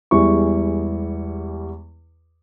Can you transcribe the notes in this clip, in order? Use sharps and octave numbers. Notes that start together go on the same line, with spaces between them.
E2 G3 G#3 E4 C#6